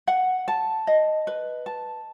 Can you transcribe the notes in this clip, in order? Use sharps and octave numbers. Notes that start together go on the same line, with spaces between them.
F#5
A5
D#5
B4
A5